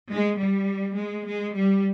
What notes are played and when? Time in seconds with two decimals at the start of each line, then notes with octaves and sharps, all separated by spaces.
0.09 G#3
0.38 G3
0.96 G#3
1.26 G#3
1.54 G3